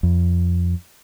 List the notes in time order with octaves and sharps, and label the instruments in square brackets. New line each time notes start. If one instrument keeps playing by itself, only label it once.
[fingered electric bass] F2